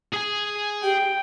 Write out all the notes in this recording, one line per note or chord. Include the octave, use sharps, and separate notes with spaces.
G#4 G#5
G4 G5